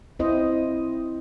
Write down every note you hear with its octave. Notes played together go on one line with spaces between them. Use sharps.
C4 E4 C5 D#5